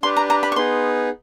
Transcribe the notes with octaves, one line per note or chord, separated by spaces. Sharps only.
D4 G4 B4 C6
A#5
A#5
B5
C#6
B3 D#4 G#4 B4 C6